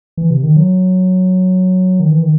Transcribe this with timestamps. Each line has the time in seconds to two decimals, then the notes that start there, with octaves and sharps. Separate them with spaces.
0.17 E3
0.30 C3
0.43 D#3
0.56 F#3
2.00 D#3
2.11 E3
2.22 D#3